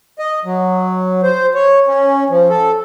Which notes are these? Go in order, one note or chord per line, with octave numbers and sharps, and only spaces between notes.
D#5
F#3
C5
C#5
C#4
F3
A4